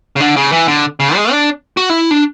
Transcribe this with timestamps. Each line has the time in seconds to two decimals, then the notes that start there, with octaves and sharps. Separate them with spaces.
0.16 C#3
0.20 D3
0.36 C#3
0.52 E3
0.68 D3
1.00 C#3
1.16 G#3
1.31 D4
1.77 F#4
1.90 E4
2.11 D4